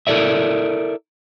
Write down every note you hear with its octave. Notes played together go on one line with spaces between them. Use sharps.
E4 A4 A#4 D5 E5